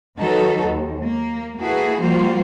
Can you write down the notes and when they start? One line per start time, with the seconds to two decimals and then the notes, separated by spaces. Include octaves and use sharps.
0.17 D#3 F#3 D#4 F#4 A4 B4
0.64 D#2
1.04 A#3
1.58 A#3 E4 F#4 G#4 A4 B4
2.00 F3 G3 A#3 F4 F#4 C5